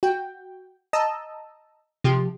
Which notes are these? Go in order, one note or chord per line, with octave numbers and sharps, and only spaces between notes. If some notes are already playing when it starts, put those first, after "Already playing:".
F#4 G5
D#5 A5 A#5 D#6 E6
C3 F3 G4